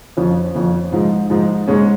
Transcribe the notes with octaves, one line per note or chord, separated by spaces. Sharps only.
F2 F3 C#4
F2 F3 C#4
G#2 F3 G#3
G#2 F3 G#3
G#2 G#3 C#4